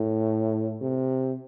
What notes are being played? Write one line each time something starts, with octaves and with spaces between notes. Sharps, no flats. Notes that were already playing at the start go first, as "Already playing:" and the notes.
Already playing: A2
C3